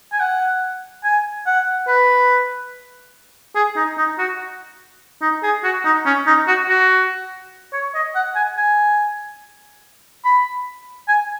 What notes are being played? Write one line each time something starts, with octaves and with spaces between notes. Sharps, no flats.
G#5
F#5
G#5
F#5
B4
G#4
D#4
D#4
F#4
D#4
G#4
F#4
D#4
C#4
D#4
F#4
F#4
C#5
D#5
F#5
G#5
G#5
B5
G#5